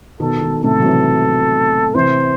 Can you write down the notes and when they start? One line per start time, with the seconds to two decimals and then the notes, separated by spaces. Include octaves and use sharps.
0.20 B2 D#3 A4
0.42 B2 D#3
0.64 A2 C3 A4
0.80 F#3
0.85 C3 E3
1.95 C3 E3 C5